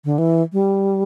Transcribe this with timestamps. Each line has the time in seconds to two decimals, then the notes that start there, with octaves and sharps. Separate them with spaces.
0.05 D3
0.18 E3
0.53 G3